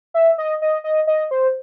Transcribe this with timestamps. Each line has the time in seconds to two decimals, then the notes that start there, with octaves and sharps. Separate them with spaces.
0.14 E5
0.38 D#5
0.62 D#5
0.84 D#5
1.07 D#5
1.31 C5